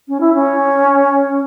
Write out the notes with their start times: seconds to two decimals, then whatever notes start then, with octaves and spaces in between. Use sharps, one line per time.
0.09 C#4
0.20 E4
0.34 C#4